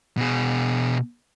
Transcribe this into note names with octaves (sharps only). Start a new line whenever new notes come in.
B2 G#4